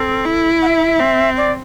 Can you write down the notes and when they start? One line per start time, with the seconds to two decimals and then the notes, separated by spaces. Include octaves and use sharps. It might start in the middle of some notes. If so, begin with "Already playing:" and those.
Already playing: C4 A4
0.24 E4
0.62 F#5
0.67 E5
1.00 C4
1.37 D5